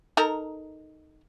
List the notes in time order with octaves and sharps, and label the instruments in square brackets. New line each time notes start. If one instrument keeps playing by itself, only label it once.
[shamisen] D#4 A4 A#4